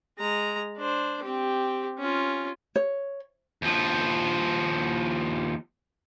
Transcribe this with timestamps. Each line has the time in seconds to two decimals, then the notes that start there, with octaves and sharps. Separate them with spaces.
0.18 G#3 A#5
0.78 D4 C5
1.22 C4 G4
1.99 C#4 F4
2.76 C#5
3.62 D#2 F3